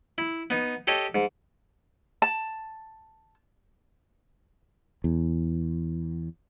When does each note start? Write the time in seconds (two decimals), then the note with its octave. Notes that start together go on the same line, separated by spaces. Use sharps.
0.18 E4
0.50 B3 D#4
0.87 G4 A4 C#5 D#5
1.15 G#2
2.22 A5
5.04 E2